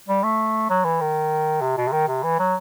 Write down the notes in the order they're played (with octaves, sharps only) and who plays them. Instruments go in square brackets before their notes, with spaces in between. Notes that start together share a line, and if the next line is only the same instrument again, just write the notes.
[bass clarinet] G3
A3
F#3
E3
D#3
C3
B2
C3
D#3
C3
E3
F#3